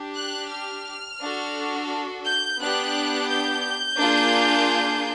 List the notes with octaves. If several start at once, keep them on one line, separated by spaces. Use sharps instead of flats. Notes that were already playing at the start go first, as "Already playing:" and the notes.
Already playing: D4 G4
F#6
F6
D4 F#4 A4
G6
B3 D4 G4 F#6
G6
A#3 D4 F4 G#4